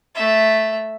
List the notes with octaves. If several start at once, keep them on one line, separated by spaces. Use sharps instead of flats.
A3 E5